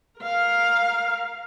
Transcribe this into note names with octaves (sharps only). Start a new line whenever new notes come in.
A#4 F5